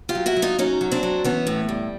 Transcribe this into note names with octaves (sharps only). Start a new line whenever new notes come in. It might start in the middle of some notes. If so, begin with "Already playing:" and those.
F4 G4
F#3
E4 F#4
F#3
D#4 F4
F#3 C#4 D#4
F#3
C4 D4
F#3
E3 B3 C#4
A2
G3